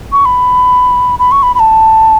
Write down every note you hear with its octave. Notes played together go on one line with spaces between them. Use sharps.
C#6
B5
B5
C#6
B5
B5
A5